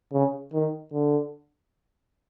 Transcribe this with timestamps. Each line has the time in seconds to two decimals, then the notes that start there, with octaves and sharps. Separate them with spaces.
0.13 C#3
0.53 D#3
0.93 D3